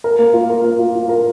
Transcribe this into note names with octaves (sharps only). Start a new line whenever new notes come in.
A#4
A#3
F4
A#4
A#3
F4
F4
A#4